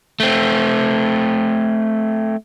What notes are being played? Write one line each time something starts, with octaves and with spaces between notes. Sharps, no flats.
A3 C4